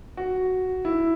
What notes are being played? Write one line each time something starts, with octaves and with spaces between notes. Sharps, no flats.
F#4
E4